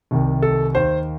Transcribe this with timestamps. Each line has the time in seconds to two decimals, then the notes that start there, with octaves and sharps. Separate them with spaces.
0.11 C2 C3 D#3
0.42 A4
0.75 D#2 D#3 C5